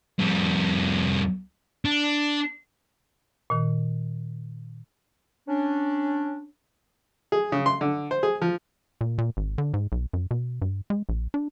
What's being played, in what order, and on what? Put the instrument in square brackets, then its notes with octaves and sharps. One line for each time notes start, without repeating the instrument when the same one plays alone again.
[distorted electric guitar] F2 G3
D4
[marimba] A#2 D#3
[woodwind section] C#4 D4
[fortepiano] G#4
C#3
C6
D3
C5
G#4
F3
[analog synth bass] A#2
A#2
G#1
D3
G#2
B1
F#2
B2
G2
G#3
A#1
D4